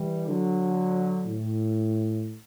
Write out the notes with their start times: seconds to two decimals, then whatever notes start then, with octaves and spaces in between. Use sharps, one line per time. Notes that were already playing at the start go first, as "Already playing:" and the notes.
Already playing: E3 G3
0.27 D3 F#3
1.26 A2